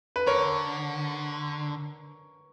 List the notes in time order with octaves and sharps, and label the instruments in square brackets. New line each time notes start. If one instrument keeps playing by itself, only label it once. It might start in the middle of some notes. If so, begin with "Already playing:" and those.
[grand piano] B4
[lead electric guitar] D3 [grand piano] A#4 C#5